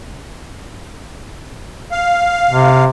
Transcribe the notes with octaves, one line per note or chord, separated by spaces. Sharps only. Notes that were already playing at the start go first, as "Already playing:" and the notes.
F5
C3